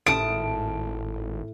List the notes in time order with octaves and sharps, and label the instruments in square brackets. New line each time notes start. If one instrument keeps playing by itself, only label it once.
[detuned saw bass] G#1 [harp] A2 [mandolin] A5 D#6 [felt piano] D7